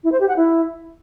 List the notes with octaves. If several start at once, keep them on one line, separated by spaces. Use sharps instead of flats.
E4
C5
G4
F#5
E4